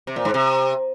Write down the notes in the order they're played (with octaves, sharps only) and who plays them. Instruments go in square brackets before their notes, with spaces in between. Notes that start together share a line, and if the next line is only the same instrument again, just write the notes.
[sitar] C3
A#2
G#2
C3